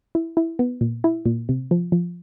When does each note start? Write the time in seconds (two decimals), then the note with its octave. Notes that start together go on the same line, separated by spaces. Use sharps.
0.15 E4
0.37 E4
0.59 B3
0.81 A#2
1.04 E4
1.25 A#2
1.49 C3
1.71 F3
1.92 F3